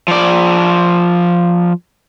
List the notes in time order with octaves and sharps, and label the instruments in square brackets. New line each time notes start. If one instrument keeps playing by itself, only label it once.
[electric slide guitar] F3 D5